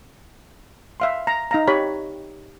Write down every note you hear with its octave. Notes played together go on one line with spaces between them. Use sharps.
E5 F5 C6
A#5
D#4 F5 A#5
G4 C#5 B5